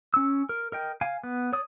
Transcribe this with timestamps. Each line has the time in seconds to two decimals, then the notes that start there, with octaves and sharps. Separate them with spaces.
0.14 C#4 E6
0.49 A#4
0.72 A#4 D#5 G5
1.01 F5 G#5
1.23 B3
1.53 C#5 D5 D#6